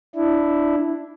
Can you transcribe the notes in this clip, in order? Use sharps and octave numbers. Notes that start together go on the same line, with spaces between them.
D4 E4